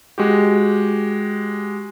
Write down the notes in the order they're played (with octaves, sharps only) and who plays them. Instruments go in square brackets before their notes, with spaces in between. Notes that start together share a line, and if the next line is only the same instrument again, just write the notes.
[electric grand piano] G#3 F#4 G4